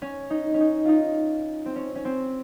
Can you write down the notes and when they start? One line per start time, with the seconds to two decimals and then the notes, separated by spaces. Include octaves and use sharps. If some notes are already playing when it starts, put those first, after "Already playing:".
0.02 C#4
0.30 D#4
0.54 C#4
0.60 D#4
0.85 D#4 F4
1.66 C4
1.76 C#4
1.95 C#4
2.05 C4